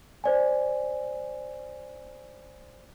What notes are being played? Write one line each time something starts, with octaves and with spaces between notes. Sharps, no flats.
C5 D5 G#5